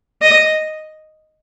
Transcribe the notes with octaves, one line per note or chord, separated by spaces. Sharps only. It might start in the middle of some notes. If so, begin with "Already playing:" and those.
D#5